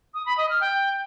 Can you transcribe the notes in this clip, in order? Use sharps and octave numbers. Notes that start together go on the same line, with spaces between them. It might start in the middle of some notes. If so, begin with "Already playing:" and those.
D#6
B5
D#5
F6
G5